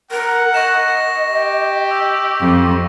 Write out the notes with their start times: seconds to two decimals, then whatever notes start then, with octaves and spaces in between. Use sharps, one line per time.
0.11 A#4 F#5
0.54 D#5 C#6 A#6 E7
0.97 A#6
1.27 G4
1.91 E6
2.41 F2